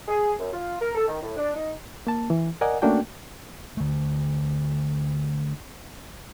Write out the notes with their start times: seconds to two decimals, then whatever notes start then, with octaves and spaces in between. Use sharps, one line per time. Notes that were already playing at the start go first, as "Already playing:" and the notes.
0.08 G#4
0.39 F#2
0.53 F4
0.81 A#4
0.95 A4
1.08 D#3
1.22 A2
1.37 D4
1.55 D#4
2.07 A#3 A5
2.30 E3
2.61 A#4 D5 D#5 F#5 G#5
2.82 A3 A#3 C#4 D4 F#4 G5
3.77 D3 A3